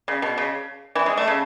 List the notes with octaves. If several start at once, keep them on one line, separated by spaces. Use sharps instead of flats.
C#3
B2
C#3
E3
G#3
A3
C#3